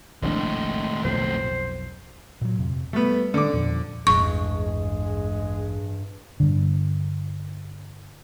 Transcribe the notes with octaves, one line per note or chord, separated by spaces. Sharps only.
F1 A#1 D#2 A2 G#3 D4
B1 F2 C5
A#2 F#3
F2 C3
G3 A3 B3
D3 D6
E2 A#2 F3
A1 E2 G2 G#3 C#6
G2 D3